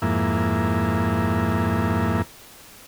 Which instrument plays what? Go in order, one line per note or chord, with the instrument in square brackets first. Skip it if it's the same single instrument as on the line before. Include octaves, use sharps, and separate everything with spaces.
[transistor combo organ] F2 G#2 A#3 E4